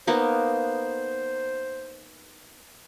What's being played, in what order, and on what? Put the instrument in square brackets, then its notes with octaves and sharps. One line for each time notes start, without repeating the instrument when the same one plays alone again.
[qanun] A#3 B3 D#4 [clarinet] C5